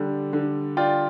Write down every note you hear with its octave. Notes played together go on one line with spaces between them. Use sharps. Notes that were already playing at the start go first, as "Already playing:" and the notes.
Already playing: D3 G3
D3
F4 D5 G5